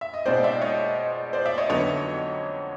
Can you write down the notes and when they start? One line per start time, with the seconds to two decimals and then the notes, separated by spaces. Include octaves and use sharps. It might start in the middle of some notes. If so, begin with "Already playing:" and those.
0.01 E5
0.14 D#5
0.26 B2 G#3 C4 D#4 C5 D5
0.43 D5 E5
0.62 C#5 D#5
1.33 C5 D5
1.46 D5 E5
1.58 C#5 D#5
1.69 F2 D3 F#3 B3 D#4 C#5 D#5